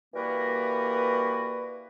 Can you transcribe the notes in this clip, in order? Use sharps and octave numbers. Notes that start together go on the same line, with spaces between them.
E3 G3 A#3 F#4 A#4 B4